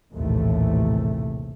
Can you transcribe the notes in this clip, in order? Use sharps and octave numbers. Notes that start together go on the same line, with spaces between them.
A#1 D#2 A2 C3 E3 A3